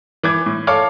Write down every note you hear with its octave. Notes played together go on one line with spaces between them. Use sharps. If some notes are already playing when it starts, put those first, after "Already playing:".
E3 D6 G#6
A2
A4 C#5 F5 D6 F6